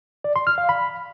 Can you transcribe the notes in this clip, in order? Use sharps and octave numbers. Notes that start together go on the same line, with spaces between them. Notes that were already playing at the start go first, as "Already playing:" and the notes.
D5
C6
F6
F5
B5